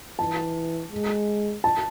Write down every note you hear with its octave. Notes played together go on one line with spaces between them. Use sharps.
E3 A5
G#3
A5